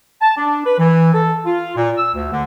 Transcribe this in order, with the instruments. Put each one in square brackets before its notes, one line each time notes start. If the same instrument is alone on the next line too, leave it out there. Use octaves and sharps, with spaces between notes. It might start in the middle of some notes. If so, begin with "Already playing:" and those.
[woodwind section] A5
D4
B4
E3
A4
F4
A#2
E6
D2
D3